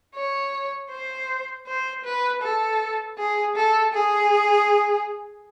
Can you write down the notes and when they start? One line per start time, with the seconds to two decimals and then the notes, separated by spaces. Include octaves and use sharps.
0.15 C#5
0.91 C5
1.67 C5
2.04 B4
2.42 A4
3.18 G#4
3.56 A4
3.93 G#4